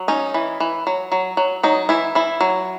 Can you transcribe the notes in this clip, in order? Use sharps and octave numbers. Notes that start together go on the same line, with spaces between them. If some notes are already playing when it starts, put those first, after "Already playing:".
Already playing: F#3
C#4 D#4
E3
E3
F#3
F#3
F#3
F#3 D#4
E3 E4
E3 E4
F#3